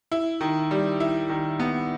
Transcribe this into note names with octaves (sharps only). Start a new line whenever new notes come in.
E4
D#3
G3
E4
D#3
B3